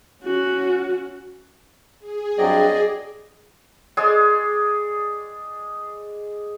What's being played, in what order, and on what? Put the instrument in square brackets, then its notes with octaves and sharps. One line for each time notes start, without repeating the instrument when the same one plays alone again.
[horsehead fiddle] C#4 F#4
[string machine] G#4
[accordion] G2 F#3 C4 [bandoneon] D5 D#5
[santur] G#3 G#4 D5